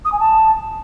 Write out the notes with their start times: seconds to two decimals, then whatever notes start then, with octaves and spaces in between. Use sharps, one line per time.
0.05 D#6
0.12 G#5
0.19 A5